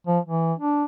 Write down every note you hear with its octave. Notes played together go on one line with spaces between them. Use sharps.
F3
E3
D4